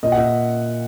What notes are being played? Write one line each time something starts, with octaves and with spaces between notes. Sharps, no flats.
A#2 D#5
F#5
A#2 E5